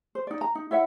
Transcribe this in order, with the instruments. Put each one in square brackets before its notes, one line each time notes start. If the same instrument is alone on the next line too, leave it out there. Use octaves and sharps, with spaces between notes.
[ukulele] C5
D#4 D5
A#5
D#4
E4 C#5 E5 F#5